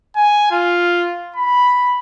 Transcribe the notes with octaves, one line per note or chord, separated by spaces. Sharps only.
G#5
F4
B5